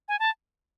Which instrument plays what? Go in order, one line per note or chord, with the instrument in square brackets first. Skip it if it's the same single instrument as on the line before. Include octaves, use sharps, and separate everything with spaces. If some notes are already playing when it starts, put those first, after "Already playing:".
[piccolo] G#5
A5